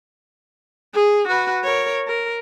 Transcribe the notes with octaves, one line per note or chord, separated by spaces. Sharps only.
G#4
F#4 B4
A#4 C#5
A#4